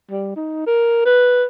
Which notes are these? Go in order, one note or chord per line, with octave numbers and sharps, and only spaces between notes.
G3
D#4
A#4
B4